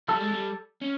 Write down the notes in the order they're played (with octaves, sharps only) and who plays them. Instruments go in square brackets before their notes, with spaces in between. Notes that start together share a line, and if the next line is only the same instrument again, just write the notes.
[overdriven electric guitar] G3 [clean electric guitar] A4
[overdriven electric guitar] G#3
G3
C#4